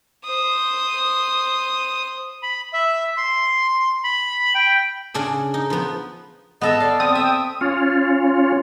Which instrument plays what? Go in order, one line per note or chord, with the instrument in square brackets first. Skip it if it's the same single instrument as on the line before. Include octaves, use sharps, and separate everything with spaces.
[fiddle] C5 D#6
[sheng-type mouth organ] B5
E5
C6
B5
G5
[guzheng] C#3 D4 G#4
D#4
F3 B3
[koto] B3 A4 E5 [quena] D#5
[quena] D5 [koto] F5
[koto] C4 [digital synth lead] D#6
[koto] E5 [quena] G5
[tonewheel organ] C#4 F4